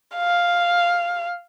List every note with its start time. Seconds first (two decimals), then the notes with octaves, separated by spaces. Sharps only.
0.16 F5